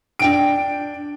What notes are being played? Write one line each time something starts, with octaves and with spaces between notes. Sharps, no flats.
D4 G5 D7